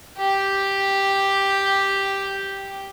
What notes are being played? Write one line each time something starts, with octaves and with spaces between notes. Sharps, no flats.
G4 G5